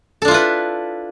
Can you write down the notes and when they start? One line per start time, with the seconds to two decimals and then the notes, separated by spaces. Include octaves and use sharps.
0.22 A4
0.25 D4
0.28 F4
0.31 E4
0.34 B4